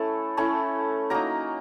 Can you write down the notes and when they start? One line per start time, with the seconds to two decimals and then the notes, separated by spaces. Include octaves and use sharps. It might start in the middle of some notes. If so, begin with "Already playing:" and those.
Already playing: A3 C#4 E4 A4
0.37 A3 C#4 E4
1.10 F#3 A#3 D#4 A#4 A#5